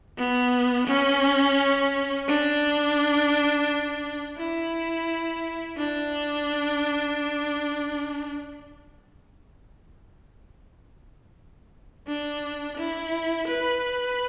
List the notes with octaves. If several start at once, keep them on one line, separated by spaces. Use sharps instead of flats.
B3
C#4
D4
E4
D4
D4
E4
B4